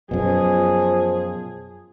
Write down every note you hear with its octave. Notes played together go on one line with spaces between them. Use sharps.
F#2 B2 F3 G#4